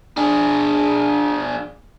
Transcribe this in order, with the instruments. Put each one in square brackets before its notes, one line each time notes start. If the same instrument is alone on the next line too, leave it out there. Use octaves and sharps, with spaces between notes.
[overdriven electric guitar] D4 G#4